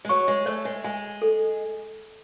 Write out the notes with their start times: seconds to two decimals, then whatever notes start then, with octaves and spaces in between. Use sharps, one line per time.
0.05 G#3
0.09 F#3 C#6
0.28 G#3
0.46 A3 C#5
0.65 G#3
0.84 G#3 G#5
1.22 A4